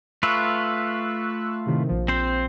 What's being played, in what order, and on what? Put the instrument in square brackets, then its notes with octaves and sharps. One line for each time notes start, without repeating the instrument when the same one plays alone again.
[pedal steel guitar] A3 F4 B4 [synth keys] C#6 E6 F#6
[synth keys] A2 C3 D#3
A#1 F3
[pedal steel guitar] C4 C5